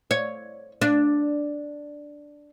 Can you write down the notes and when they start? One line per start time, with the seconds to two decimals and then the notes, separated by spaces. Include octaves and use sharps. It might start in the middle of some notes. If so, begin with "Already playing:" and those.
0.11 C#5
0.82 D4